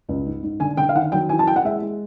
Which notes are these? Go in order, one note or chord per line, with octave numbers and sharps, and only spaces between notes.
C#2
G#2
G#2
D3 G#5
D3 G5
F5
D#3 F#5
F#3 G5
E3 G#5
A5
E3 G5
F#5
G#3 E5
G#3